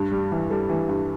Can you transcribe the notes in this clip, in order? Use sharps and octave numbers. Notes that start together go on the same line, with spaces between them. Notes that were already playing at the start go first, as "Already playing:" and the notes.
Already playing: G2
G3
E3
G3 A4
E3
G2